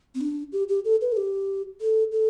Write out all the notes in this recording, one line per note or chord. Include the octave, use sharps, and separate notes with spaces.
C4
D4
G4
G4
A4
B4
A4
G4
A4
A4